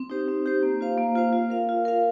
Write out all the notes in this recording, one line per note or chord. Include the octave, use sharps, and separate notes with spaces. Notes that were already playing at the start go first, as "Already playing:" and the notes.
Already playing: C4
D#4 G4 C5
C4
D#4 G4 C5
A#3
F4 C5 F5
A#3
F4 C5 F5
F4
A#4 F5
F4
A#4 F5